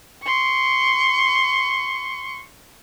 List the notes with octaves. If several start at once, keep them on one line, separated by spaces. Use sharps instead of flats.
C6 C#6